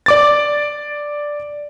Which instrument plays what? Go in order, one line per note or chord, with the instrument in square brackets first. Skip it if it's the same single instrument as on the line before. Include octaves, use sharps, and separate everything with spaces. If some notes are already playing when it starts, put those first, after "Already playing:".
[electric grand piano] D5 D6 A6